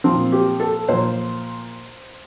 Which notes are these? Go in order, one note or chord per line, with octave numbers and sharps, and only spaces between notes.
A#2 F3 C4
G4
A4
A#2 F3 C5